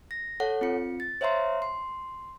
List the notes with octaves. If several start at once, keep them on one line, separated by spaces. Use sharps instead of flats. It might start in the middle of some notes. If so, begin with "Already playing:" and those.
A#6
A4 C#5 F#5
C4 F4 C#7
A6
C5 C#5 E5 F5 A#5 C6
C6